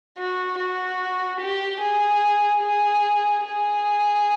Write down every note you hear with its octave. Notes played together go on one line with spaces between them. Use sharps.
F#4
F#4
G4
G#4
G#4
G#4